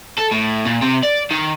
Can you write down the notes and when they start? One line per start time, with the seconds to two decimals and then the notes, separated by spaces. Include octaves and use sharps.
0.18 A4
0.31 A2
0.65 A#2
0.82 C3
1.03 D5
1.31 D#3